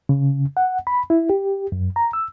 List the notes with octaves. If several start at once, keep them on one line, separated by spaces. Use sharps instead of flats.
C#3
F#5
B5
E4
G4
F#2
A#5
E6